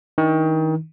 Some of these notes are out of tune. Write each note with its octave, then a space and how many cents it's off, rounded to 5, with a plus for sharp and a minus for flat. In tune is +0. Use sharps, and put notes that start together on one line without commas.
D#3 +30 D4 +30